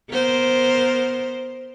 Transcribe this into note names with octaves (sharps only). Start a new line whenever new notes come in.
B3 A#4 C5